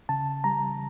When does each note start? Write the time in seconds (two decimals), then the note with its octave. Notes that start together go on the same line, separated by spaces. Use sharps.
0.09 C#3 A5
0.44 G3 A#5